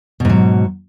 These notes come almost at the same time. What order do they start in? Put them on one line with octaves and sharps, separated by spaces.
B2 G#2 F#3